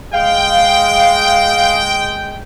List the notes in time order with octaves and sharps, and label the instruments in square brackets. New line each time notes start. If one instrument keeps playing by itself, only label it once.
[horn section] G#3 G5 [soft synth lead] F5